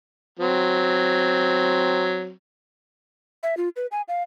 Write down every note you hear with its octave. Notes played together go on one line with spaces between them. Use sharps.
F#3 C4
E5
F4
B4
G#5
F5